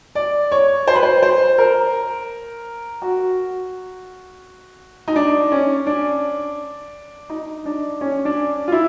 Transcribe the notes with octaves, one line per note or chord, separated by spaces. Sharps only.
D5
C#5
C5
B4
C5
C5
A#4
F#4
D#4
D4
C#4
D4
D#4
D4
C#4
D4
F4
E4